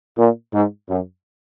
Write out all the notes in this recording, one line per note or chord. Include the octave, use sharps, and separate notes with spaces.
A#2
G#2
F#2